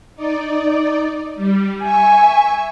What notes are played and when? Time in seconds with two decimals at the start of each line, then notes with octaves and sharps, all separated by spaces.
0.15 D#4 D5
1.36 G3
1.82 E5 G#5 C#6